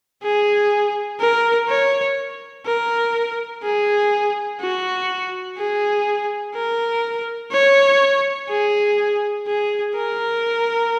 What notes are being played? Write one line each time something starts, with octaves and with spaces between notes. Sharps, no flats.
G#4
A#4
C#5
A#4
G#4
F#4
G#4
A#4
C#5
G#4
G#4
A#4